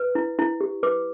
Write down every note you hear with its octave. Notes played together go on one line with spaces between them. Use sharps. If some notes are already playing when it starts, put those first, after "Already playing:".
Already playing: B4
E4
E4
G4
B4 D6